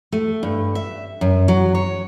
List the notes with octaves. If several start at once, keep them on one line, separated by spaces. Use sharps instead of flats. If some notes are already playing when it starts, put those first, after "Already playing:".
A3
G2
E5
F#2
F#3
C#5